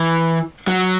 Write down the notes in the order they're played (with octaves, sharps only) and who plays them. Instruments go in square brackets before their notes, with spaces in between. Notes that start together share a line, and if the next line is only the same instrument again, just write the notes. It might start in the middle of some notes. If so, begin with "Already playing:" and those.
Already playing: [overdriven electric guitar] E3
F#3